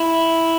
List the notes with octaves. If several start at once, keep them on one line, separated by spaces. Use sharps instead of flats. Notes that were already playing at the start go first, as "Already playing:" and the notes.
Already playing: E4